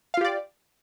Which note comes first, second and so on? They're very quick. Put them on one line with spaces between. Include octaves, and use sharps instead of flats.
F5 F4 G4 D5